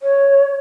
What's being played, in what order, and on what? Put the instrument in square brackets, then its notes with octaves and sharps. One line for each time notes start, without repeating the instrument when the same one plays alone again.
[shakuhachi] C#5